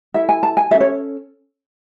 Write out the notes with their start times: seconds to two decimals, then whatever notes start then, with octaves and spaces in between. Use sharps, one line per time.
0.14 E4 A4 E5
0.29 G#5
0.43 A5
0.57 G#5
0.71 C#4 F#4 A4 E5
0.81 C#5